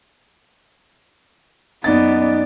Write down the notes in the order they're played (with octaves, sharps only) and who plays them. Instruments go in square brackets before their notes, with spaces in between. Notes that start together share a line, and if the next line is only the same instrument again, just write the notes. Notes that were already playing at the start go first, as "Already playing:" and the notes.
[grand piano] F#2 D#4 A6 [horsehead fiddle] B3 D5